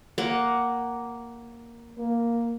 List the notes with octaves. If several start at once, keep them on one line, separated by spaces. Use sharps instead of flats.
A#3 F#5
A#3